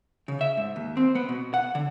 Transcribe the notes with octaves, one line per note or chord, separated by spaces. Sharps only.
C#3
E5
G#2
D#2
C4
B3
B2
F#5
D3